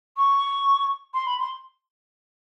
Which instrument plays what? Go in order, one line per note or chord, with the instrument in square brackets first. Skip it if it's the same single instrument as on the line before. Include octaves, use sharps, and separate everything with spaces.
[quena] C#6
C6
B5
C6